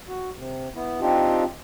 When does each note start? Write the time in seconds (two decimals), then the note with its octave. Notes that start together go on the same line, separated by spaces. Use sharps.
0.08 F#4
0.35 C3
0.75 B3 E4
1.01 C4 D4 D#4 F4 G4